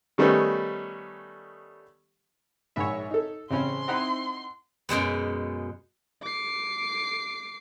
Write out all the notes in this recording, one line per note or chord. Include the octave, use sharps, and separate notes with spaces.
D#3 G3 A3 B3 C#4 D#4
A#1 G#2 C#5 E5 B5
D#4 A4
A1 C#3 C4 C#4 B5 C6
C4 D#4 E4 F#5 F#6
F#2 B2 G#3 B3
D6 C7